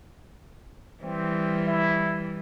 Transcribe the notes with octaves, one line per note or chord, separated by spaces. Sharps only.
E3 G3 C4
E4